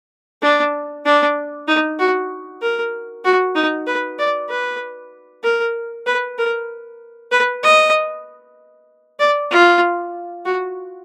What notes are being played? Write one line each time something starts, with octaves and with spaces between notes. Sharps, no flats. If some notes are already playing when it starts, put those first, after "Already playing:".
D4
D4
D#4
F#4
A#4
F#4
D#4
B4
D5
B4
A#4
B4
A#4
B4
D#5
D5
F4
F#4